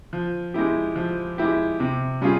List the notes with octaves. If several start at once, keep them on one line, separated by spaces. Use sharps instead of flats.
F3
G#3 E4 G4
F3
G#3 E4 G4
C3
G3 C#4 F4 G#4